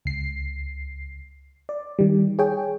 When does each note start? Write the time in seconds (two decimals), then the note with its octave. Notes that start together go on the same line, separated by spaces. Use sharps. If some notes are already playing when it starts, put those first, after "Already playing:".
0.05 C#2 C7
1.69 D5
1.99 D#3 G3
2.39 G#4 C#5 G5